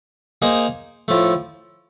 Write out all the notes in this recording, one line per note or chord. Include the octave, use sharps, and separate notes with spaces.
A#3 D#4 G#4 C5 D#5
A2 F3 A3